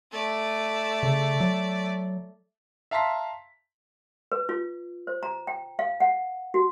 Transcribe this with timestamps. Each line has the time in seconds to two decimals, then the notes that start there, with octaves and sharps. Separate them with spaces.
0.12 A3 D5
1.03 C#3
1.40 F#3
2.91 E5 F5 A5 A#5 C6 B6
4.32 B4
4.49 F4
5.07 C5
5.23 A#5
5.47 G5
5.79 F5
6.00 F#5
6.54 F#4